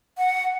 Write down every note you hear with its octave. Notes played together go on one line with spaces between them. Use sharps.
F#5